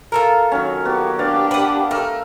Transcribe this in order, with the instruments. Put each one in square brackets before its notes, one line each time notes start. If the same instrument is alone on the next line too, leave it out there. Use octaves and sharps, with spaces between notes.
[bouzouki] F4 A4 A#4
[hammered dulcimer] D#3 F#3 C#4
[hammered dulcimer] B3 F#4 [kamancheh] G4
[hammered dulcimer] B3 D5 F5 [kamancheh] D4 G4
[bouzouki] B4 F#5
[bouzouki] A3 [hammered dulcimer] A#4